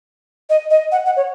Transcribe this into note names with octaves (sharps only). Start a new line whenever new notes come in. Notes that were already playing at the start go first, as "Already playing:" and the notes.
D#5
D#5
F#5
F#5
C#5